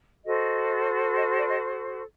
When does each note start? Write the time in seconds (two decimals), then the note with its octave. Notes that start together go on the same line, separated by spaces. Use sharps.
0.25 F#4 A4 C5 D#5
1.16 D#5
1.38 D5
1.49 D#5